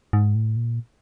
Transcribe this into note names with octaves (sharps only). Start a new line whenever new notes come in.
G#2
A2
A#2